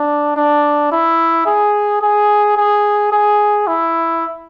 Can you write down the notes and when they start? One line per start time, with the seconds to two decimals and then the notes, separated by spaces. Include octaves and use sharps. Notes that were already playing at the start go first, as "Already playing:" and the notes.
Already playing: D4
0.37 D4
0.92 E4
1.46 G#4
2.02 G#4
2.57 G#4
3.12 G#4
3.67 E4